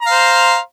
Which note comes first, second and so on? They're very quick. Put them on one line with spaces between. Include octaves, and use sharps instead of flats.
A#5 F5 C5